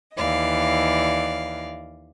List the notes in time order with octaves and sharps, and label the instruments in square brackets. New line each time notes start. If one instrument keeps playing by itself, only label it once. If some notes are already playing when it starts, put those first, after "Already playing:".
[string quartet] D#2 E3 D5 D#5 F5